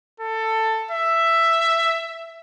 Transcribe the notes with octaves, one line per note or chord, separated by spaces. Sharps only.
A4
E5